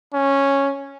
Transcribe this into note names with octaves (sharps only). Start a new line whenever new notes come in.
C#4